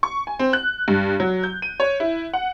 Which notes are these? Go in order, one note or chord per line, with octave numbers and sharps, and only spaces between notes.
C#6
G#5
C4
F#6
G2
F#3
G6
D#7
C#5
E4
F#5